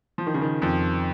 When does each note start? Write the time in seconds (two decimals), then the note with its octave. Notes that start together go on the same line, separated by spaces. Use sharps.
0.18 F3
0.27 D#3
0.34 C#3
0.42 D#3
0.62 F2 F3